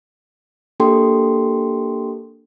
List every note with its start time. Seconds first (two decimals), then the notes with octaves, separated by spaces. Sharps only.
0.80 A#3 D4 G4 A4 G5 C6